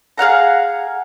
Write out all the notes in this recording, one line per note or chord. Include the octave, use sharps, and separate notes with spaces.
G#4 F5 F#5 A#5